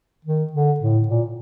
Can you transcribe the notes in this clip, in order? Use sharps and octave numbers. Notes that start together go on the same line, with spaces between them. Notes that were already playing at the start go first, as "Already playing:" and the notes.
D#3
D3
A2
A#2